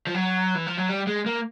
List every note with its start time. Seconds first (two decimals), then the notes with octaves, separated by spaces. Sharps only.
0.07 F3
0.14 F#3
0.55 E3
0.66 F3
0.77 F#3
0.88 G3
1.07 G#3
1.26 A#3